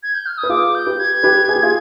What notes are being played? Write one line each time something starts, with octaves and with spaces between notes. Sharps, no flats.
G#6
G6
F6
D#6
B4
F4 G#4 D6
G6
G4 B4
G#6
G4 B4
G#4
G4
F4 G#4